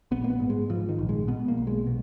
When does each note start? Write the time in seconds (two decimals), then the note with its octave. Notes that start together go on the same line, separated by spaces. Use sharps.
0.11 A#1 B3
0.24 A#3
0.30 B3
0.40 G#2
0.50 G#3
0.70 G#2 F3
0.89 D#3
0.98 A#1
1.09 G#3
1.28 B2 B3
1.48 A#3
1.58 B1
1.67 G#3
1.87 B2